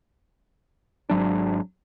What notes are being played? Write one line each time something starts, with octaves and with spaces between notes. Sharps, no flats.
G#1 F#3 D4